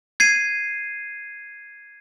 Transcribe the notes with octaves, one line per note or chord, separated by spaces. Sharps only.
G#6 C7 D#7